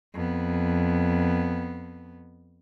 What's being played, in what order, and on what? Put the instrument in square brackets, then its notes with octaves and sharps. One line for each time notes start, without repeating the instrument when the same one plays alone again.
[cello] F2 B3